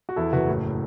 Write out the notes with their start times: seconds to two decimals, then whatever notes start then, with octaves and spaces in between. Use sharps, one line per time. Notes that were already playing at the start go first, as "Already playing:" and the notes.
0.09 F#4
0.16 E2 E4 A4
0.33 F#1 F#4 B4
0.48 A2